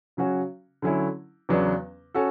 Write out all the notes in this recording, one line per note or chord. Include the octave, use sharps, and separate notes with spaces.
C#3 F#3 C#4 F#4
D3 F#3 C#4 E4
E2 C#3 F#3 B3 D4
C#4 F#4 A4